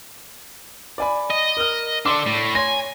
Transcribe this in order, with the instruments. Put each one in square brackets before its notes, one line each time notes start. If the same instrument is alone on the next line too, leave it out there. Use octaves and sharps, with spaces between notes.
[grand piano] D5 G#5 B5
[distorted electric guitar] D#5
[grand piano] A#4 F6
[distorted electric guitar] D4 A4 [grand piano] D5 C6 D6
[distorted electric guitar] A2
[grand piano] C#5 C6 A#6 [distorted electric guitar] G#5